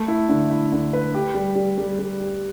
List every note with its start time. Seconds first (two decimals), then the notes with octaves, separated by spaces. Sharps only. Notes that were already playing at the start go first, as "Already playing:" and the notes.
Already playing: A3
0.08 E4
0.29 D3
0.50 E4
0.72 D3
0.93 B4
1.15 G4
1.34 G3
1.56 G3
1.78 G3
1.99 G3
2.20 G4